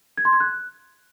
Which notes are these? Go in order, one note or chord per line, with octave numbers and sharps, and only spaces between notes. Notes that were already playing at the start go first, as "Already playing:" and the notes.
G#6
C6
G#6
F#6